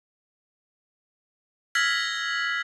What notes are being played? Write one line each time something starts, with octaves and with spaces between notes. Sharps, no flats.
E6 F6 G#6 A#6 B6 F#7